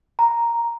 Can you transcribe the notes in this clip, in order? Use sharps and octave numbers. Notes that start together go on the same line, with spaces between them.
A#5